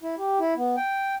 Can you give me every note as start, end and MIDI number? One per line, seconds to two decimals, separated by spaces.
0.03 0.15 64
0.18 0.39 67
0.40 0.54 64
0.57 0.76 59
0.77 1.15 79